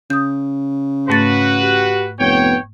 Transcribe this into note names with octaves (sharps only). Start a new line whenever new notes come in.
C#3 D#6 G6
G#2 A3 F#4 B4 A6
G4
F1 B3 C#5 G5